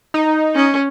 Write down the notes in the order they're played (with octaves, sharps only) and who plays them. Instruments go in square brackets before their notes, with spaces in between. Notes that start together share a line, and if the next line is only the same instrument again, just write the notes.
[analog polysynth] D#4
[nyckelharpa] C#4